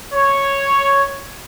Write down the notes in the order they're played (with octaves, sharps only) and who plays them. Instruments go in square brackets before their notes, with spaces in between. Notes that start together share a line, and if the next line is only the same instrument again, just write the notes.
[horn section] C#5